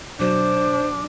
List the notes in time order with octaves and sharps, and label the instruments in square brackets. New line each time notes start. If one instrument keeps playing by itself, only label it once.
[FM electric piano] B2 F#3 [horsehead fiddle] D4 [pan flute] C5 [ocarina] D6